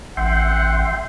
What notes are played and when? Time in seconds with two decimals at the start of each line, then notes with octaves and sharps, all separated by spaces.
0.17 A1 E5 F#5 G5 C6